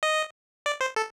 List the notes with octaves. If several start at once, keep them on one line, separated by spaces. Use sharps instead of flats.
D#5
D5
C5
A4